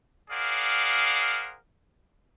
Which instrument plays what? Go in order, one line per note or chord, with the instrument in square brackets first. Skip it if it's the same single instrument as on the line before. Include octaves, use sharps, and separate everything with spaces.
[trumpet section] G#4 A#4 C5 D5 F5 F#5